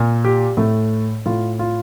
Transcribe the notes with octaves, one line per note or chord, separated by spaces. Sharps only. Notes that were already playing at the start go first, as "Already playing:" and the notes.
Already playing: A#2
G4
A2 A3
A2 F4
F4